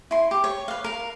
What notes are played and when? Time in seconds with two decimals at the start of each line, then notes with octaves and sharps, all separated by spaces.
0.11 E4 C6
0.31 G4
0.44 C#5
0.68 B4 F5
0.84 A#4 F5